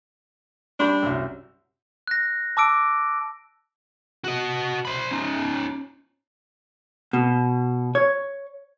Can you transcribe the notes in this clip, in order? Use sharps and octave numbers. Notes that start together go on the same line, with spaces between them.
G3 D4 B5 G6
C2 F#2
F#6 A#6
A5 D6 E6 D7
F#4 D#5
C5 B5
C#4 D#4
B2
C#5